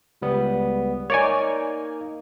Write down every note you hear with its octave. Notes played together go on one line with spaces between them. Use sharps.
C#2 G3 B3
A#3 D#4 C#5 D5 G#5